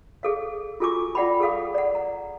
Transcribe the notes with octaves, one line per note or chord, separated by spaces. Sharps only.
G#4 A4 F5
F4 F#4 A4 G#5 C#6 D6
F4 D5 F#5 G5 A5 B5
G#4 A4 F5 D#6
D5 F#5
A#5